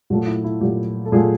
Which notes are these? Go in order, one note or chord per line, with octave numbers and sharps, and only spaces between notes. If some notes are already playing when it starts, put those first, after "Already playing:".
A#2 F#3 A3 F#4
E4
E4
A#2 F#3 A3 G4
A4
A#2 F#3 A3 G#4